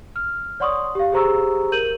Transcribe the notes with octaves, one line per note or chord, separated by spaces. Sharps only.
F6
C#5 D5 F#5 C6 C#6 D#6
G4 F5
G4 G#4 C5 A#5 C#6 E6
A#4 G6 D#7 F#7